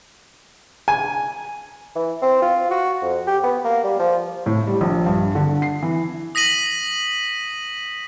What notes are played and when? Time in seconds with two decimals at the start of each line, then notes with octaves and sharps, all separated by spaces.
0.88 G#5
1.95 E3
2.22 C4
2.42 F4
2.71 F#4
3.02 F2
3.27 G4
3.43 B3
3.64 A#3
3.84 G3
3.99 F3
4.46 A2
4.67 G3
4.81 A#1
5.06 G2
5.35 D3
5.62 C7
5.83 E3
6.35 D#6 A#6 B6 D#7 F#7